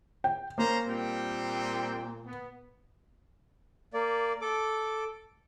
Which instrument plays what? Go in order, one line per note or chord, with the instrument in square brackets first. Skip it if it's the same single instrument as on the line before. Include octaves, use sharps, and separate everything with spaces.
[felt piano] G5
[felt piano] A#3 [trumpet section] C#4 C5 A#5
[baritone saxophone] A#2 [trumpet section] G3 C4 G5
[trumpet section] B3
[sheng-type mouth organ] A#3 D5
A4 D6